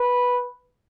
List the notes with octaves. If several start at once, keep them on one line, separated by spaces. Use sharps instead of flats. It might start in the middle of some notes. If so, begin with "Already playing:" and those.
Already playing: B4